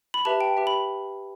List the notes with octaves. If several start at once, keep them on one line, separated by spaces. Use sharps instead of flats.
B5
G4 B4 E5 A5
G5
G4 B4 E5
B5